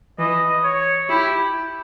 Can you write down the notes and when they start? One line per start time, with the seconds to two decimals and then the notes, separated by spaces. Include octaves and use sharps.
0.19 E3 D#5
0.64 C#5
1.09 E4 G4